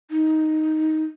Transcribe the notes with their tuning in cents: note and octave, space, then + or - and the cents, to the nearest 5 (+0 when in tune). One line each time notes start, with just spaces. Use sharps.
D#4 +5